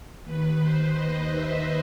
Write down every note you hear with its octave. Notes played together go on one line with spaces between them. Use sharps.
D#2 D#3 B4
C5
D#5
E5